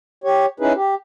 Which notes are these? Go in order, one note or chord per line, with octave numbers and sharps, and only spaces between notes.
G4 C#5
C#4 D#4 E4 G#4 B4
G4